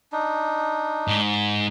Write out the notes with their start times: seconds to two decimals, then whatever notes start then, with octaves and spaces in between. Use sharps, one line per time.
0.12 D4 D#4
1.08 G#2